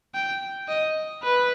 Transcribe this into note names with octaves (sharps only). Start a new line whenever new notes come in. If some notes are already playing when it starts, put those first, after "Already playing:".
G5
D#5
B4